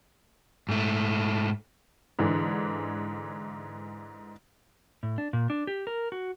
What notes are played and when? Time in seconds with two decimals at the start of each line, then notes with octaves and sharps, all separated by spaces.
0.69 G#2 A3
2.19 G#2 D3 E3
5.03 A2
5.18 D4
5.33 A#2
5.50 D4
5.67 G4
5.87 A#4
6.12 F#4